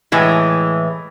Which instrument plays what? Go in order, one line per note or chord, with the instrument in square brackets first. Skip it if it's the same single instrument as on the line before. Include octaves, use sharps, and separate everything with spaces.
[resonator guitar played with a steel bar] A2 E3 G#3